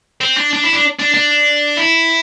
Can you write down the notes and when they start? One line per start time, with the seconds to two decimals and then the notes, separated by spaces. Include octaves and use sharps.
0.21 C4
0.37 D4
0.53 D4
0.63 E4
0.73 D4
0.99 D4
1.14 D4
1.77 E4